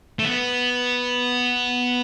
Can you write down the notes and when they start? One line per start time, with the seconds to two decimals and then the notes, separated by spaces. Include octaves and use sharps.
0.19 A3
0.24 B3